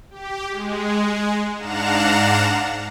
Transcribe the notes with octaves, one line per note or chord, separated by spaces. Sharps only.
G4
G#3
G#2 D4 F5 F#5 A#5 E7